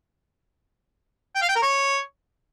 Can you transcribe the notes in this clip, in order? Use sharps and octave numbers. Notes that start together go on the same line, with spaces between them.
G5
F5
G5
A#4
C#5